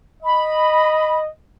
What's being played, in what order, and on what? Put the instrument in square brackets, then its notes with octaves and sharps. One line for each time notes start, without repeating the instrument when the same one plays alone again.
[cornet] D#5 [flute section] B5